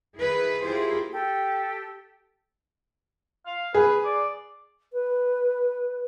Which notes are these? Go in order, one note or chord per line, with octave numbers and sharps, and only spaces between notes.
D#3 E4 G#4 B4
A#3 E4 F4 G4 G#4 C5
G4 A4 G5
F5
G#4 B4
D5
B4